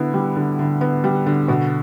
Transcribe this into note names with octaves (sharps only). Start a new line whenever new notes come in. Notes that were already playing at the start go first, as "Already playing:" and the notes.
Already playing: D3 B3 E4
G3
D3
D3
B3
G3
D3
B2 F#4